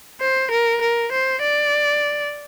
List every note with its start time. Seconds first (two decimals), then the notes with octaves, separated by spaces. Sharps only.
0.21 C5
0.51 A#4
0.81 A#4
1.12 C5
1.41 D5